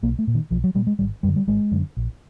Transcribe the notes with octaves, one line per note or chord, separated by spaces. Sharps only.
B1 A#3
A3
A#2
D#3
B1 F3
F#3
A#2 G3
G#3
G#1 G3
F#2 D3 G3
G3
G#1 G#3
F#2 D3
A#1